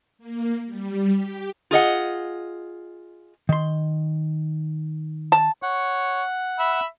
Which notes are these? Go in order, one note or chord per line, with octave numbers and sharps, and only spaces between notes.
A#3
G3
G4
F4 G#4 D#5 F#5
D#3 C6
A5
C#5 F#5
E5 B5